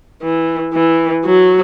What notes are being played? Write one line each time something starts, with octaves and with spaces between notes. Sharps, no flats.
E3
E3
F#3